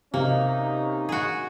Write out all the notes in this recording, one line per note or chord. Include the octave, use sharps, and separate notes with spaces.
C3 A#3 C#4 D#4
F#4 G#4